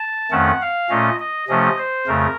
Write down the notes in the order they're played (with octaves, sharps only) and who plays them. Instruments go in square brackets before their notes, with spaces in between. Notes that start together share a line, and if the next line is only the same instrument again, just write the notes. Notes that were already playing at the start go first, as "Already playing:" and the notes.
Already playing: [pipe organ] A5
F2 D#3 A3 C#4 F#5
F5
A#2 A3 C#4 D#5
D#5
C3 F3 A3 C#4 D#5
C5
F2 C#3 A3 A#4